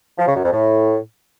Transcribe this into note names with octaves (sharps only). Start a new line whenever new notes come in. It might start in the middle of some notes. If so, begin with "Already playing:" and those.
F3
C#3
F#2
F2
A2